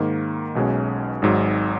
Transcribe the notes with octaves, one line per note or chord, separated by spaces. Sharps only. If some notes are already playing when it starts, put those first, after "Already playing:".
Already playing: G#2 D#3 A#3
B1 B2 G#3 C#4
G#1 G#2 F#3